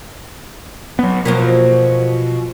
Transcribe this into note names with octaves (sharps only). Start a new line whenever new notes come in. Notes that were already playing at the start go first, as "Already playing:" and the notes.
F#3 B3
B2 F3 F#3 A#3